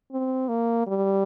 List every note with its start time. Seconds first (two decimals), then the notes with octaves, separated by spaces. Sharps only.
0.12 C4
0.48 A#3
0.87 G3